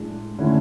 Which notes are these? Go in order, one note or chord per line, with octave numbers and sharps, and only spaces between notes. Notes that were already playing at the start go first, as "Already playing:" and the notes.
Already playing: A2 G#3 D4 G#4
D3 A3 C#4 E4